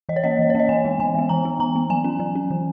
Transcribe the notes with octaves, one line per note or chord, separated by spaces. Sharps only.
E3 D#5
C#5
A#3 C#4 D#5
E3
C#5
A#3 C#4 D#5
E3 G#5
G#3 B3
E3 G#5
G#3 B3
E3 A#5
B3
E3 A#5
B3
F#3 G#5
C#4
F#3
C#4
E3